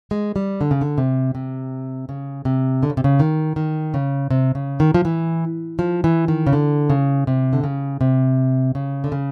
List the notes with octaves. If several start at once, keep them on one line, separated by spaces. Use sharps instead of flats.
G#3
G3
D3
C#3
D3
C3
C3
C#3
C3
D3
C#3
C3
C#3
D#3
D#3
C#3
C3
C#3
D#3
F3
E3
F3
E3
D#3
C#3
D3
C#3
C3
D3
C#3
C3
C#3
D3
C#3